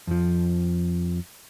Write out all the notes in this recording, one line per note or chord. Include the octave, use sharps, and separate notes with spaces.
F2 F3